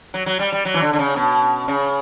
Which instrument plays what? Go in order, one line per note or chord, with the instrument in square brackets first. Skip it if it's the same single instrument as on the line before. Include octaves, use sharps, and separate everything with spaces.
[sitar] F#3
F#3
G3
G3
F#3
E3
D3
D3
C#3
B2
C#3